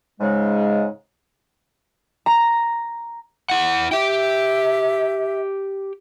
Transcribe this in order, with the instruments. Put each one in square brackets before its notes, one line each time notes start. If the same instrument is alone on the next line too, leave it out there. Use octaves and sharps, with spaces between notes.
[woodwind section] G#2 C#3 G#3
[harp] A#5
[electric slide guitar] E4 F#5
[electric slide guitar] G4 G5 [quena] E5